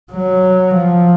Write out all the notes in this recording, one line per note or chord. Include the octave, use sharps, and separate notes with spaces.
F#3
F3